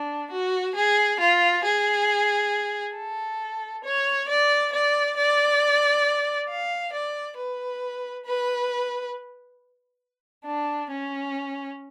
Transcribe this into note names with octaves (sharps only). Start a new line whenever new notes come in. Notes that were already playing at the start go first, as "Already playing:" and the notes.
Already playing: D4
F#4
G#4
F4
G#4
A4
C#5
D5
D5
D5
F5
D5
B4
B4
D4
C#4